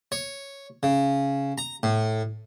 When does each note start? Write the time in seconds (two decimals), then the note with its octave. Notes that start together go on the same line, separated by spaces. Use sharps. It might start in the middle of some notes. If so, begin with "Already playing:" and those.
0.12 C#5
0.83 C#3
1.58 A#5
1.83 A2